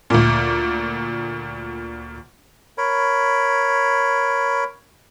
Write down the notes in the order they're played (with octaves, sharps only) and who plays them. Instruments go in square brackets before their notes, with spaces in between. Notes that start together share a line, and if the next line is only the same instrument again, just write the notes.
[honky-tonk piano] D2 A#2
[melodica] A#4 C#5 B5